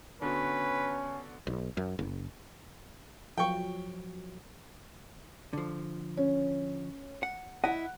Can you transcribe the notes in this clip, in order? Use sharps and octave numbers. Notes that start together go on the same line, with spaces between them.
D3 B3 C#4 F#4 B4
B1
F#2
F#1
F3 F#3 G5 C#6
D3 F3
C#4
F#5
E4 D#5 F#5